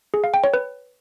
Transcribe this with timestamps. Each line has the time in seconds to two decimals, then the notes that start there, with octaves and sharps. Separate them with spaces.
0.14 G#4
0.24 F5
0.34 G5
0.44 C#5
0.54 B4